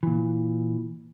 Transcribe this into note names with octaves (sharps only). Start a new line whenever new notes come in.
A#2 E3